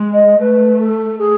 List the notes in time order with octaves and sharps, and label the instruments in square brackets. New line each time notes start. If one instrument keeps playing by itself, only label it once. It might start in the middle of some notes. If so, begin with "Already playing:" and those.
Already playing: [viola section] G#3
[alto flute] D#5
[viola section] A3 [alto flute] B4
[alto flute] A4
G#4